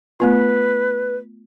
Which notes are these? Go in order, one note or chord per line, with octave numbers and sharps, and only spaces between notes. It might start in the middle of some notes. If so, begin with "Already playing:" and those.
A3 B3 F4 B4